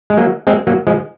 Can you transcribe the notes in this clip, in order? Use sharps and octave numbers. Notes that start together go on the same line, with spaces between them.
G#3
F#3 A#3
G#3 C4
F#3 A#3
F3 G#3